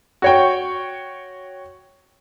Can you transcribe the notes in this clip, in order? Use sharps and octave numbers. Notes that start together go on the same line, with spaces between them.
F#4 C#5 G5